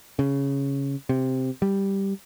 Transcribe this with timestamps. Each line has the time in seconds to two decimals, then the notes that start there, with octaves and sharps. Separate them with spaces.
0.19 C#3
1.09 C3
1.62 G3